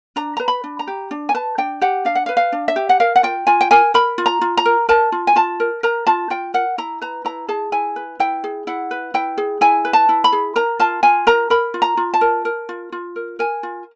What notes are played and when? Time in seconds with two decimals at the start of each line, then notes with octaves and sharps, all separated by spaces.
0.16 D4 A#5
0.37 B4 A#5
0.48 B5
0.64 D4
0.79 A#5
0.87 G4
1.11 D4
1.29 G#5
1.34 B4 A5
1.58 D4 G5
1.81 G4 F#5
2.05 D4 F5
2.15 F#5
2.26 F5
2.29 B4
2.37 F5
2.52 D4
2.68 E5
2.76 G4
2.89 F#5
3.00 A#4 F5
3.16 F#5
3.23 F4 G5
3.47 F4 G#5
3.61 G5
3.71 A#4 G#5
3.94 A#4 B5
4.18 F4
4.26 A#5
4.41 F4
4.57 A#5
4.65 A#4
4.89 A#4 A5
5.12 F4
5.27 G#5
5.36 F4 A5
5.60 A#4
5.83 A#4 A#5
6.07 F4 A5
6.30 F4 G5
6.54 A#4 F#5
6.78 E4 A#5
7.02 B4 A#5
7.25 E4 A#5
7.48 G#4 A5
7.72 E4 G#5
7.96 B4
8.20 E4 G5
8.44 G#4
8.67 E4 F#5
8.91 B4
9.14 E4 G5
9.38 G#4
9.61 E4 G#5
9.85 B4
9.93 A5
10.09 E4
10.24 B5
10.32 G#4
10.56 A#4 A#5
10.79 F4 A5
11.03 F4 G#5
11.27 A#4 A#5
11.50 A#4 B5
11.74 F4
11.82 A#5
11.97 F4
12.14 A5
12.21 A#4
12.45 A#4
12.69 F4
12.92 F4
13.16 A#4
13.39 A#4 G#5
13.63 F4